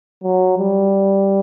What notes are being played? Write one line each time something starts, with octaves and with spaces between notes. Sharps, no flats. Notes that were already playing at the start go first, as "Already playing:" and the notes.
F#3
G3